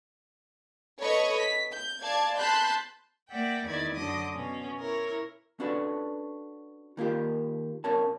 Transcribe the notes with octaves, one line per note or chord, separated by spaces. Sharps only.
A4 B4 C#5 D#5 B5 C#6
B6
G6
D5 F5 A5 G#6
A5 B5 C6 F#6 G6
A#3 D5 E5 F#5 G5
E2 D#3 E4 D5 G#6
F#2 D3 F#3 D#5 D6 D#6
B2 C#4
E4 A#4 C#5
C#4 D4 F#4 A4 B4
D#3 A#3 F4 G4
B1 C#4 A#4 C#5 A5